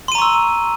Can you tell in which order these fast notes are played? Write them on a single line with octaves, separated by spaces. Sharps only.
C6 D#7 A#5 C#6 E6